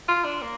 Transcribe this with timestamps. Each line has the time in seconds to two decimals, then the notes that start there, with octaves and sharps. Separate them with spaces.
0.08 F4
0.24 D4
0.42 A#3